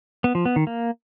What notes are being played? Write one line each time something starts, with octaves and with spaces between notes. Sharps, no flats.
B3
F3
B3
D#3
A#3